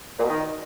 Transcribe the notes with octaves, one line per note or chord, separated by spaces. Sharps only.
A#2
B2
D#3